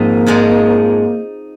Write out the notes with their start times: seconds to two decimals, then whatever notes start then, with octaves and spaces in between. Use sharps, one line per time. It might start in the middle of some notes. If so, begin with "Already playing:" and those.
Already playing: F2 G#2 F3 A#3 C4 D#4
0.27 G#2 F3 G#3 D#4